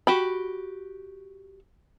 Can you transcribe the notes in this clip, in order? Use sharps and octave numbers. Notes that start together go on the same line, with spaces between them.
F#4 G4 B5